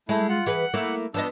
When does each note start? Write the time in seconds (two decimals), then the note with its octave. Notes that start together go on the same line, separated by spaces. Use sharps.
0.09 G#3 A3 E4
0.29 F4 F#5
0.46 E3 G#4 B4 F#5
0.74 A3 A#3 E4
1.14 F3 B3 D4 D#5 E6